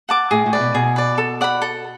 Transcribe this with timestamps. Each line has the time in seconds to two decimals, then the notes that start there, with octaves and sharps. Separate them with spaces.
0.09 F#5 A5 D6
0.31 A2 G#4
0.46 A2
0.53 B4 D5
0.60 B2
0.74 B2 G#4
0.96 B4 D5
1.18 A4
1.41 D5 F#5 B5
1.62 A4